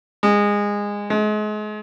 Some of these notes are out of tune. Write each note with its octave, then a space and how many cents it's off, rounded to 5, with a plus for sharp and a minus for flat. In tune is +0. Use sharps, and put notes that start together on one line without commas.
G#3 -20
G#3 +35